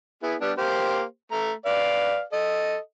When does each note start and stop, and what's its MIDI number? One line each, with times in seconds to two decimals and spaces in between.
0.23 0.35 59
0.23 0.35 64
0.23 0.35 68
0.41 0.52 55
0.41 0.52 59
0.41 0.52 62
0.58 1.03 58
0.58 1.03 67
0.58 1.03 72
1.32 1.52 57
1.32 1.52 82
1.66 2.22 71
1.66 2.22 74
1.66 2.22 77
2.32 2.78 69
2.32 2.78 75